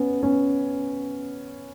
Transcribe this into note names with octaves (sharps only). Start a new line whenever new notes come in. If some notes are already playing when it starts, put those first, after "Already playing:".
Already playing: B3 C#4
B3 C#4